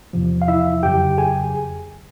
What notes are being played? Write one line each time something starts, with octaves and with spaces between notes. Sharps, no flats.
E2 C3 F3
F5
E4 E5
F2 C#3 F#3 G4 G5
G#4 G#5